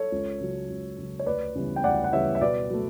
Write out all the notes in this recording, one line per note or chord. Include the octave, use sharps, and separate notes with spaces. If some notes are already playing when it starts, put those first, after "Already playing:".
Already playing: A4 C#5
C#2
C#3 F#3
C#2
C#3 F#3
C#5
D2 B4 D5
C#3 E3 G3 B3
G5
D2 D5 F#5
F#5
C#3 E3 G3 B3 C#5 E5
E5
B2 B4 D5
F#3 A3